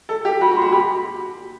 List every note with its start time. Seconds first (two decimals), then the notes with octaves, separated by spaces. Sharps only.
0.09 A4
0.25 G4
0.41 F#4 B5
0.51 F#4
0.56 C6
0.62 F#4
0.72 G4 B5